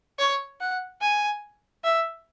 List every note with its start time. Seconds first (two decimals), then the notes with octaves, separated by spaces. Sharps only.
0.19 C#5
0.60 F#5
1.01 G#5
1.84 E5